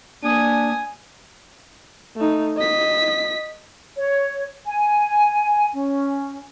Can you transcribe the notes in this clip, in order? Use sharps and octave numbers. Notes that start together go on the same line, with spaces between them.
A#3 D4 G#5 D#6
A3 D#4
D#5 B6
C#5
G#5
C#4